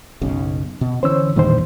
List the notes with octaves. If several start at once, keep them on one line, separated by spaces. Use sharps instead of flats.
F#1 B1 C#3
B2
D3 E3 C#4 C5 C#5 E6
A1 E2 G2 A#2 D#3 C5